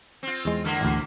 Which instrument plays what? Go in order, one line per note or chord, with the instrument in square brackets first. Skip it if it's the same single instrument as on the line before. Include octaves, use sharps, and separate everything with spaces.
[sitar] C4 F4
[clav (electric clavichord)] E2 G#3
[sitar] D3 A#3 E4
[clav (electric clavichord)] A1 D2